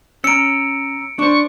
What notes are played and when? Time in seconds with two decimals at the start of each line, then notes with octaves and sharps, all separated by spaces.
0.24 C#4 A#5 E6 C#7 D7
1.19 D4 C5 C#6